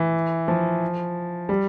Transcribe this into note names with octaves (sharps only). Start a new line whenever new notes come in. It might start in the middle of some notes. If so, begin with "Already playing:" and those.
Already playing: E3
F3
G3